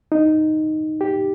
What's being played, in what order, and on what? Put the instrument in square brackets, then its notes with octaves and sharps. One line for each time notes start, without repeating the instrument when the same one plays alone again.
[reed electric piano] D#4
G4